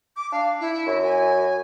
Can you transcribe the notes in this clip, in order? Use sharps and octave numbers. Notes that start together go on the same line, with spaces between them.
D6
D4 F5
E4
F#2
G#5